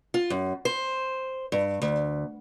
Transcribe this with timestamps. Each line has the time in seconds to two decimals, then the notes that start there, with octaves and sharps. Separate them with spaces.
0.14 F4
0.30 F#2
0.65 C5
1.52 G2
1.82 D2